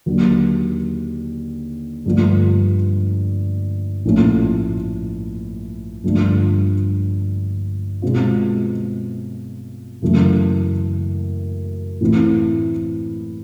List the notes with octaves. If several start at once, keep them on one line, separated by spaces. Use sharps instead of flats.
D#2 D3 F#3
G2 D3 F3 A3
A#1 A2 F3 A3 C#4
G2 D3 F3 A3 D4
B2 G#3 C4 F4
F#2 C#3 E3 A3
A2 E3 A3 C4 E4